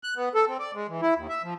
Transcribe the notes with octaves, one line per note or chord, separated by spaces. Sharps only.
F#6
B3
A4
C4
D5
G#3
E3
E4
D#2
E5
F3